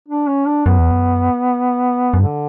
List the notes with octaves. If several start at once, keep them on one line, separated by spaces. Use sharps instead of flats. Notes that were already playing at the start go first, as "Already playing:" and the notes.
D4
C#4
D4
F#2 B3
E2
F#2
F#2
G2 D3